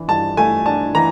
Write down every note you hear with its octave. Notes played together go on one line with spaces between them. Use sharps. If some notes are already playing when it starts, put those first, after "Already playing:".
Already playing: E3 D4
G2 A5
A3 G#5
D4 A5
E3 A#5